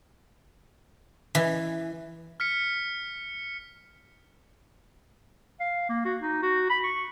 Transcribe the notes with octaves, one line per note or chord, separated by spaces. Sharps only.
E3
F6 B6 C#7
F5
A#3
F#4
D#4
F#4
B5
C#6